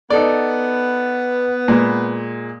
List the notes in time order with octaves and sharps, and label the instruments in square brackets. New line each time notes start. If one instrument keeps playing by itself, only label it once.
[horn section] B3 [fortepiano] D#4 A4 D5
[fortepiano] A#2 G#3